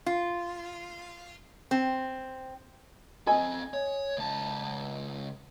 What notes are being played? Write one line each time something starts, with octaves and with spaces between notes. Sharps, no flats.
F4
C4
C4 A4 D#5 G#5
C#5
C#2 A5